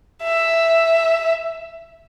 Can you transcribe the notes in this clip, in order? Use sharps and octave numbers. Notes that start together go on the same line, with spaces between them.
E5